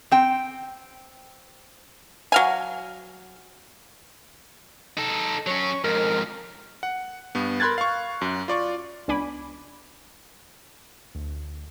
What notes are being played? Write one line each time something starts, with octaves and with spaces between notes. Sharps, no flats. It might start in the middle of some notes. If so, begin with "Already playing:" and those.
C4 G5
F#3 F5 G#5
D#4 A4
F#3 C#4 C#5
F2 G#2 A#4
F#5
G2 B3
A#4 B5 C6 F#6 G#6 A6
F5 C#6
F#2
F4 D5 C#6
C#2 B3 D4 G#5 B5 D6
D2